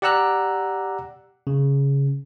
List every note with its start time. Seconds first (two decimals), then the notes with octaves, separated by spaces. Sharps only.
0.02 G4 D5 F#5 A#5 E6 F#6
1.47 C#3